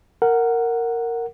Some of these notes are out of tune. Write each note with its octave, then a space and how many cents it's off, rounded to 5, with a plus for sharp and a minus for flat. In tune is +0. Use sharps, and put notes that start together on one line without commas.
A#4 -10 F#5 +0